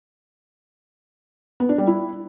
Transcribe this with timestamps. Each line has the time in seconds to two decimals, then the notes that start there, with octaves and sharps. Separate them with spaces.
1.60 B3
1.69 D4
1.78 G3
1.87 E4